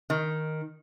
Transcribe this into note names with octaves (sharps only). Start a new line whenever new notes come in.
D#3